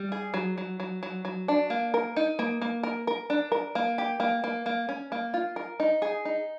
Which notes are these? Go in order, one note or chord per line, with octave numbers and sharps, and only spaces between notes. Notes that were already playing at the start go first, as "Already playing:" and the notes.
Already playing: G3
G#4
F#3
F#3
F#3
F#3
F#3
D4
A#3
A#4
D#4
A#3
A#3
A#4
A#4
D4
A#4
A#3
G4
A#3
A#3
A#3
C#4
A#3
F4
A#4
D#4
G#4
D#4